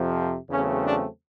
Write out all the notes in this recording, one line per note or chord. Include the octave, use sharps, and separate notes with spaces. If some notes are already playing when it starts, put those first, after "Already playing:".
Already playing: F2 C3 F3
E2 C#3 F#3 A3 C4 C#4
D4